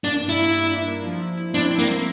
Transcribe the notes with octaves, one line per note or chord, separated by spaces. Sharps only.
A#3 D4
G2
E4
A#3
G2
D4
A#3
F3
E4
E4
C4 D4
E4
A#3
E4